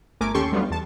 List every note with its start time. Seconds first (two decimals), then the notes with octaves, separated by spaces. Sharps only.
0.20 G1 A3 A#4 G#5 D6
0.34 D#2 C#4 G4 A4 C6 C#6
0.52 F#3 G3 A3 B3 D4 F4
0.70 E2 A5